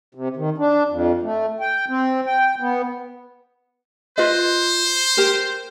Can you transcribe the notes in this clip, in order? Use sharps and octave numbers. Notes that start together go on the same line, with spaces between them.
C3
D#3
D4
F2
A3
G5
C4
G5
B3
F4 B4 C5 D#5
G4 A#4